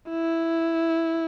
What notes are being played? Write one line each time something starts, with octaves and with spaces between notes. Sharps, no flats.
E4